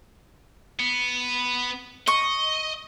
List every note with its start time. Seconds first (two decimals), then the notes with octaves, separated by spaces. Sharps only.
0.80 B3
2.08 D#5 C#6